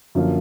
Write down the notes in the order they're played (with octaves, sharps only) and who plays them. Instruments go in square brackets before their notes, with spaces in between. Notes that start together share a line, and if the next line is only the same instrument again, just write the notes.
[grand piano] F#2 D3 F3 A#3